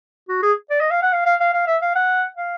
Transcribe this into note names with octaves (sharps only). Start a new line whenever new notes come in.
F#4
G#4
D5
D#5
F5
F#5
F5
F5
F5
F5
E5
F5
F#5
F5